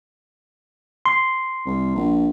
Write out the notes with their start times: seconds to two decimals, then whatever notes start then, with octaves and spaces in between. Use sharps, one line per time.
1.06 C6
1.66 C2
1.95 A#1